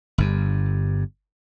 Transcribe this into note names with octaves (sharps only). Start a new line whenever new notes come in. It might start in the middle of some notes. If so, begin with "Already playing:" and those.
G1 G2